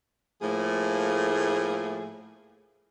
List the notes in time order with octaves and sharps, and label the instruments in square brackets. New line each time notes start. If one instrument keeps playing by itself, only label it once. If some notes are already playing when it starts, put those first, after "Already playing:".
[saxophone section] A2 F3 A3 A#3 G#4